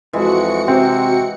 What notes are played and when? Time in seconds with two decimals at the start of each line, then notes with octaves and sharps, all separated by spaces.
0.13 F2 E3 G#3 F#4 C#7
0.68 C3 C4